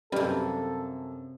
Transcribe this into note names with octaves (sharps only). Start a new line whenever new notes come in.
F#2 C3 D#3 G3 A#3 A4 B4